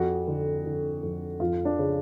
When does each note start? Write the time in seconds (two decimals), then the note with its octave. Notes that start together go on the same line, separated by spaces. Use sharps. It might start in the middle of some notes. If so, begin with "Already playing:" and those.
Already playing: F2 F#4
0.28 D3
0.65 D3
1.03 F2
1.40 F2 F4
1.65 D4
1.79 C#3